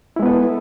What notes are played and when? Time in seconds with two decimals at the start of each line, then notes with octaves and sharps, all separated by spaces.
0.16 E4
0.19 G#3
0.23 B3
0.26 B4
0.29 A4